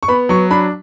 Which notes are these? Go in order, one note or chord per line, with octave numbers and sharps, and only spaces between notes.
C#6
B3 B5
F#3 C#6
D4 B5